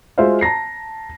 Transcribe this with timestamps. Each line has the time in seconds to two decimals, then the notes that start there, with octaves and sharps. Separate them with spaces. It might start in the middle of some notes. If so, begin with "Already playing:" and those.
0.18 G#3 F4 F#4 C5 E5 F5
0.41 A5 A#5 A#6 C7